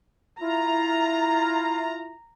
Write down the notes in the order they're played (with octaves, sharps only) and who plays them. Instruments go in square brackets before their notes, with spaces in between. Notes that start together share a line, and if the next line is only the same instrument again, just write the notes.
[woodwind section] E4 F4 [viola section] A#5